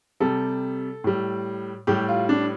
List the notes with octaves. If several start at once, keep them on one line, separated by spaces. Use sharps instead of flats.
C3 G3 A4
A2 G3
A2 G3 G4
F4
D4